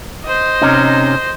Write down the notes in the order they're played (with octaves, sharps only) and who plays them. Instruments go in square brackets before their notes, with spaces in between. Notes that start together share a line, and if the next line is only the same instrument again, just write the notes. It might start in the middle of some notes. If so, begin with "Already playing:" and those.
[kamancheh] C5 D#5
[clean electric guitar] C3 C#4 D#4